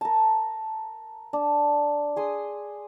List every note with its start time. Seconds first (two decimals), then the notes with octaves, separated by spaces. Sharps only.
0.01 A#4 A5
1.33 D4
2.16 G#4 C6 D#6